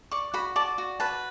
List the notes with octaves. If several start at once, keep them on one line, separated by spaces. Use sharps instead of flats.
D5 C#6
F#4 B5
D5 A5
F#4
B4 A5